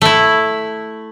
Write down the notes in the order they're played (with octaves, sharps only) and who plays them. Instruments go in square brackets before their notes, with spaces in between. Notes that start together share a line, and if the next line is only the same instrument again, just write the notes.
[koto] A3 E4